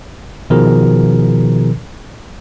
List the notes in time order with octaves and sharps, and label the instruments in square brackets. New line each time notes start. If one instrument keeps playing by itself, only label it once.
[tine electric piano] B2 D#3 F3 G#4 A#4